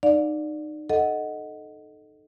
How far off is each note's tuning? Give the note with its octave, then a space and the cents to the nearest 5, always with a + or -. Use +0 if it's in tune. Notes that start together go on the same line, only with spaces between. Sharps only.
D#4 -25 D5 +0 F5 +40
A4 -10 D#5 +0 F#5 +0